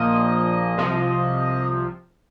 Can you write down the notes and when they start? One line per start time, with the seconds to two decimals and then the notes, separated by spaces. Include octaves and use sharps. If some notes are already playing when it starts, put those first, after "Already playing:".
Already playing: A#1 A#2 F3 A#3 D#5
0.78 C2 C3 F3